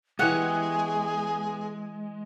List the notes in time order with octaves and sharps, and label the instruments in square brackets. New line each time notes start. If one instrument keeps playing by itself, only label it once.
[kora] E3 G4 [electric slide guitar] G#3 [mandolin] B3 C#5 F#5 [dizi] G#4